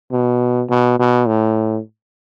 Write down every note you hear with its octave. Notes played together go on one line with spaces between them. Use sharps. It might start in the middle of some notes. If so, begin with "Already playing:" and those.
B2
B2
B2
A2